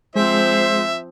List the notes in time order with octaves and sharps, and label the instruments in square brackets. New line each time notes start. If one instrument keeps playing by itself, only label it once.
[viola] F3 C4 [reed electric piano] G#3 G#4 [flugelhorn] C5 [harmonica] E5